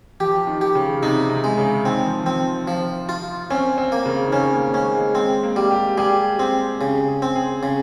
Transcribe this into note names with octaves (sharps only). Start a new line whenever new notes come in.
F3 G4
D#3
G4
C#3
C3 D#4
C3
G#3
C#3
D#3 C4
F3
F3 C4
F3
F4
C4 C#4
C4
A#3
C#3
D#3
C#3 C#4
A#3
G#3 C#4
G#3
G#3 C4
A#3
G3
G4
G3 G#4
C4 G#4
C#3 G#4
G#4
C4
G#4
C#3